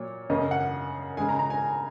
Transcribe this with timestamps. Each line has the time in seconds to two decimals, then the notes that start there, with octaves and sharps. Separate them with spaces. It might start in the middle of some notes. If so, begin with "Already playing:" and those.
Already playing: A#2 F#3 C#5
0.30 F#2 C#3 A#3 D#5
0.51 F#5
1.17 C#3 G#3 G#5
1.29 A#5
1.39 A#5
1.50 G#5